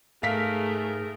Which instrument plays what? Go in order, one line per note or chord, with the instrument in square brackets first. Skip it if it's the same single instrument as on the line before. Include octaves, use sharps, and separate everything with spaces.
[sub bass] G#2 [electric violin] A3 [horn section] G#4 A#4 [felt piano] F5 B6